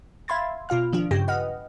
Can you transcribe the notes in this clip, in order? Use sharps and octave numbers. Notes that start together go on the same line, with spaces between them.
E5 F5 B5 C6 G#6 A6
B2 F4 F5 F6
D#3 F3 D4 F4
G2 C#3 G4 G5 A#6
B4 D#5 F#5 F6